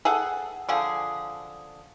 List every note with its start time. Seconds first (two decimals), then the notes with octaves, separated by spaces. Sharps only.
0.05 G#4 A4 F#5
0.69 D3 F3 G#4